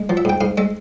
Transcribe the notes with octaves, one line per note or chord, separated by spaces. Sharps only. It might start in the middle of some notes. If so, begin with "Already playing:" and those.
Already playing: G#3
F3
E5
G#2 G5
G#2 F5
G#3 E5